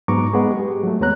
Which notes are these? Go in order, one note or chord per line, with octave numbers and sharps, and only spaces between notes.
G#2 F#3 B3 A#5 C#6 D6
G#3 B3 G#4
G4
F#3 A3
D#2 G#3 B3 C#5 A#5 F#6